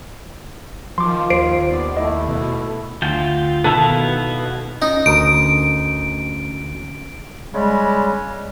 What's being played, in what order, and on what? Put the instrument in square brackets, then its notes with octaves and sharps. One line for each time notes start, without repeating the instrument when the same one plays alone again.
[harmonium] D#3 F4 [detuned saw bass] F3 [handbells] C6 D6
[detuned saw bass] D#2 [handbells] C5 C7 D7
[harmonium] B3 D5
[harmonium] A3 E4 [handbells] D#5
[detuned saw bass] B2
[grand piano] D2 [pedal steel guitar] F4 G5
[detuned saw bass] B2 [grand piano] D#3 [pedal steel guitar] B3 E4 F5 [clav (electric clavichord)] A4
[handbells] C#4 [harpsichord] D#4
[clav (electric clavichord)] D2 A#4 [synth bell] D7
[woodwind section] C#3 G3 G#3